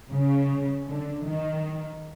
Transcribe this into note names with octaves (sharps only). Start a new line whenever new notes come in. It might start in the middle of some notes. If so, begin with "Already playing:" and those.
C#3
D3
D#3